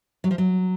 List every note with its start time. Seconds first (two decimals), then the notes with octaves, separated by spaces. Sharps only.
0.24 F#3
0.31 F3
0.38 F#3